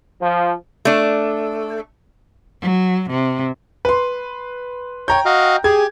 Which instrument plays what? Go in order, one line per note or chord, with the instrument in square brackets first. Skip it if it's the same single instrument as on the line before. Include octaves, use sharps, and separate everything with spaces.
[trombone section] F3
[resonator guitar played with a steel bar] A3 D4
[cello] F#3
C3
[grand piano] B4 C6
[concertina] C#5 [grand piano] G5 A#5 G6
[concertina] F#4 D#5 F5
[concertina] G4 [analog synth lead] G#4 [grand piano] G#6